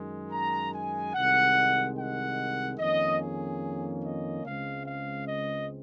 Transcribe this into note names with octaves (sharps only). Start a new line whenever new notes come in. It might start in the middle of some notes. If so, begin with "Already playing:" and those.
Already playing: F#2 D#3 G#3
A#5
G#5
C2 C3 D#3 G#3 F#5
F#5
F2 D#3 A#3 C#4 D#5
G#4
D#5
C#2 C#3 G#3 C4 F5
F5
D#5